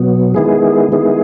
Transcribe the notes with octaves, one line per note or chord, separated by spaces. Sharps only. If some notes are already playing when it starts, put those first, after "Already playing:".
Already playing: B2 F#3 B3
D#3 G#3 B3 E4 G#4
D#3 G#3 B3 E4 G#4